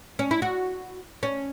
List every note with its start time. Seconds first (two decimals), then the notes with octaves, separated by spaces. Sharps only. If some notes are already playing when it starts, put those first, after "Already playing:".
0.19 C#4
0.31 E4
0.42 F#4
1.23 C#4